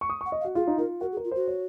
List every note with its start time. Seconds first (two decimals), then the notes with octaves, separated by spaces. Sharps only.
0.01 C#6
0.10 D#6
0.21 F#5 C#6
0.32 D#5
0.41 F5
0.44 F#4
0.55 F4 G#4
0.67 D#4
0.78 F4 A#4
1.01 F#4 A#4
1.12 G#4
1.17 A#4
1.24 F4
1.31 F#4 C5
1.48 C#5